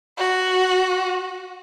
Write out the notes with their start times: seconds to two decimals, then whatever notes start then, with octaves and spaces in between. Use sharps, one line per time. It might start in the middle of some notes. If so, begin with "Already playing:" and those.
0.18 F#4